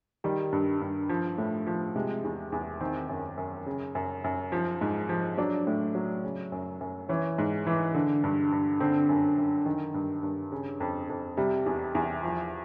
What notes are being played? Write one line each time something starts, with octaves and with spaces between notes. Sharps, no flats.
D#3 G3
G2
G2
F3
A2
F3
C3 G#3
E2
E2
D#3 C4
F#2
F#2
C#3
F#2
F#2
F3
G#2
F3
F#3 D4
A2
F#3
C#3
F#2
F#2
E3 C#4
G#2
E3
D3
G2
G2
D3 C4
F#2
F#2
D#3
G2
G2
C#3
F2
F2
C3 G3
E2
E2
F3